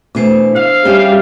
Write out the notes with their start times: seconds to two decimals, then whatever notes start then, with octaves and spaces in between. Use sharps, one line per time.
0.15 B2 E3 A3 D4 C5
0.56 E5 F5
0.85 G3 C#4 G#4 E5 G5